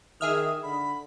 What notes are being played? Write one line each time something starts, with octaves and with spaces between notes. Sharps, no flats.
D#3 G#4 E5 D#6 F6
D3 B5